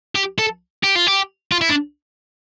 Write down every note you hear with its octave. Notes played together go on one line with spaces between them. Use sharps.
G4
A4
G4
F4
G4
F4
E4
D4